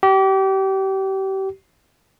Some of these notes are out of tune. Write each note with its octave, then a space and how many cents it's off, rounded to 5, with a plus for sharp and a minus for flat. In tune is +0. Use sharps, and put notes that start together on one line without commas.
G4 -30